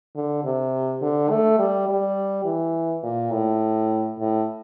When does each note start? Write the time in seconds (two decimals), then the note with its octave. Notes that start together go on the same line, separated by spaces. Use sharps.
0.15 D3
0.44 C3
1.02 D3
1.30 A3
1.59 G3
1.88 G3
2.45 E3
3.03 A#2
3.31 A2
4.18 A2